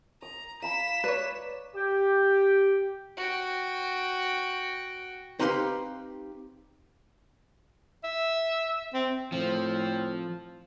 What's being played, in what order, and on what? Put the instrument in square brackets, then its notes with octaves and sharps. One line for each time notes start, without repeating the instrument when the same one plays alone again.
[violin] A#5 [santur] D#6
[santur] F5 A#5 B5 [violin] B6 E7
[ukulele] B4 C#5 [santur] D5
[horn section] G4
[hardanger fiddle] F#4 G5
[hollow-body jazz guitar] C4 D#4 G4 B4 F5 C6
[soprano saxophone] E5
C4
[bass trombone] A2 [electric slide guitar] F3 [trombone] C4